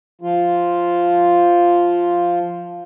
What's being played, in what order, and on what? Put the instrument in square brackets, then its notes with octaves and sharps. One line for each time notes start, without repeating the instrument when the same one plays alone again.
[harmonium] F3 F4